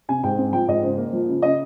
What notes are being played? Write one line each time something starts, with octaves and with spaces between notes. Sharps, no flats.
C3 G#5
G#2 G5
C4
F3 G5
G#2 D#5
C#3 C5
A#3
F3
C#3
C#3 D#5